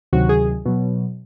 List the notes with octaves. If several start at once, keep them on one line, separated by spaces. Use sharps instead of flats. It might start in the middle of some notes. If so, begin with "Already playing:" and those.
D2 C3 D#3 F#3 F#4
G#4
B2 F#3